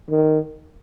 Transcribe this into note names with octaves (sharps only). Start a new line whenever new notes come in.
D#3